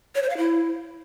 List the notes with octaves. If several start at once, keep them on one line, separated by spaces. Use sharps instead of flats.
C#5
C5
F5
E4